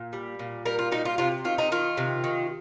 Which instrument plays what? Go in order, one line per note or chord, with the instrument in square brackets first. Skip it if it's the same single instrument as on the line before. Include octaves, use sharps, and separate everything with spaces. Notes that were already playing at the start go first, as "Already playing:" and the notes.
Already playing: [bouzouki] A#2
G3
A#2
G3 A#4
F4
A#2 D#4
F4
C3 F4
D#3 F4
D#4
D#3 F4
C3
D#3